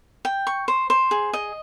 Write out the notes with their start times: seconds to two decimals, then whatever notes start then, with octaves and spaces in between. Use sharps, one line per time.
0.25 G5
0.47 C#6
0.68 C5
0.90 C5
1.11 G#4
1.33 D#5